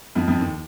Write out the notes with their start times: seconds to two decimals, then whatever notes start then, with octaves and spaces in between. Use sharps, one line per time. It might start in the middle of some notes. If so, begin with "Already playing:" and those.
0.15 F2 F3
0.28 F2 F3
0.40 D#2 D#3